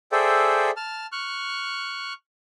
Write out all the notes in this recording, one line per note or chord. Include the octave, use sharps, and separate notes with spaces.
G#4 A4 C5 D5 E5 G5
A5 F6
C#6 F6 F#6